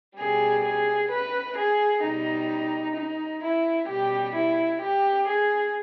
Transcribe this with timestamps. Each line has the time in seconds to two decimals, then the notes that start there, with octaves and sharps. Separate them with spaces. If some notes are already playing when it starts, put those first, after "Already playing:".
0.17 B2 G3 G#4
0.64 G#4
1.10 B4
1.56 G#4
2.03 B2 G3 D#4
2.96 D#4
3.43 E4
3.88 B2 G3 G4
4.34 E4
4.81 G4
5.27 G#4